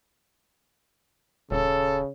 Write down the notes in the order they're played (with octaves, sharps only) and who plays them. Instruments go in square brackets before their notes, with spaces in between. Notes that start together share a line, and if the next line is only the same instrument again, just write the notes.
[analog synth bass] D#1 [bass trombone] C#3 [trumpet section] A4 [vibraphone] C#5